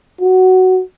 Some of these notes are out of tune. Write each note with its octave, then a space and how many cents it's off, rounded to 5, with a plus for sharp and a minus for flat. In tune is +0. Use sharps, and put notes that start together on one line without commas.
F#4 +10